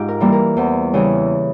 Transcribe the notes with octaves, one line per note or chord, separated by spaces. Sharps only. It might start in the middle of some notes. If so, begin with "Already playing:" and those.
Already playing: G#2 F4 G4
A#4
E3 G3 A#3
A#4
E2 C5
C#3 E3 G3 G#4